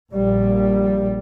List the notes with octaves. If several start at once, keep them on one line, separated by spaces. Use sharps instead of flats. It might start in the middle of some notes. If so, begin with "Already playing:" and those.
A#1 G3